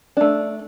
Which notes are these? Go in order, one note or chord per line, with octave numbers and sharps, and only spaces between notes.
A3 D4